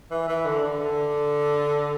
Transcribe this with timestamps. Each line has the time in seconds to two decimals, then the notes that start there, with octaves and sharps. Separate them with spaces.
0.11 E3
0.28 E3
0.46 D3
0.63 D3
0.81 D3